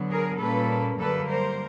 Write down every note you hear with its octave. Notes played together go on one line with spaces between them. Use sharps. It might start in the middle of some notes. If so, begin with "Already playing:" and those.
Already playing: D3 F#3 B3
G#4 A#4
A#2 G3 A#3 C#4 A4 B4
F#2 D3 G3 A#3 A4 B4
A#4 C5